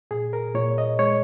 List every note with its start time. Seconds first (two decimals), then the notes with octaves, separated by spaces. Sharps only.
0.11 A#2 G#4
0.33 A#4
0.55 A#2 C#5
0.78 D#5
0.99 G#3 C#5